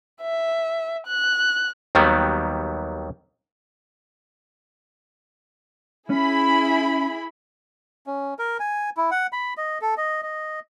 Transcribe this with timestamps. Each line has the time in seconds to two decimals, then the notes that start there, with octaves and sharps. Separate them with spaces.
0.22 E5
1.08 F#6
1.95 D#2 D#3 F#3 G3 B3
6.10 C#4 E4 G#4 B5
8.07 C#4
8.39 A#4
8.60 G#5
8.97 E4
9.11 F#5
9.33 B5
9.57 D#5
9.81 A4
9.97 D#5
10.23 D#5